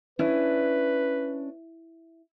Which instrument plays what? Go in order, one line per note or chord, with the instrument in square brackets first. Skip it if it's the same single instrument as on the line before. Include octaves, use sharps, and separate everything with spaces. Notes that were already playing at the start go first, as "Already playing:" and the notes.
[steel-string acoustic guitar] C#4 D4 [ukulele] E4 [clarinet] B4